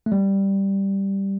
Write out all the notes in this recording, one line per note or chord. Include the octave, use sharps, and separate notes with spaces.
A3
G3